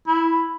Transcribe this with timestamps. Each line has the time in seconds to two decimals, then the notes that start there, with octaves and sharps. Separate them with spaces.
0.08 E4